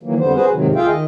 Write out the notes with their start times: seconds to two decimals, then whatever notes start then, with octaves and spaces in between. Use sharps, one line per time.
0.03 D#3 E3 F#3 A#3
0.19 F2 D3 G3 B3 C5
0.34 F#4 G#4 B4 C5
0.51 G#2 C3 D#3 F#3
0.75 D2 F4 G#4 E5 F5 G5
0.87 D#3 D#5